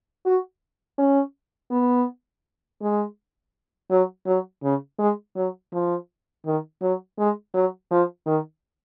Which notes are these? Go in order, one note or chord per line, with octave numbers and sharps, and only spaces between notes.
F#4
C#4
B3
G#3
F#3
F#3
C#3
G#3
F#3
F3
D#3
F#3
G#3
F#3
F3
D#3